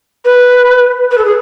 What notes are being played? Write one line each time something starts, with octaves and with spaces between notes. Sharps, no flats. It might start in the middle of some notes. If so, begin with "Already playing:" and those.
B4
B4
A4
G#4